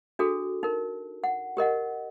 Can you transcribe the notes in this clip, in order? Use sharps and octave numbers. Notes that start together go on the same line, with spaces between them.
D4 F#4 G#4 A4
D#4 A#4
F#5
G4 A#4 D#5 F#5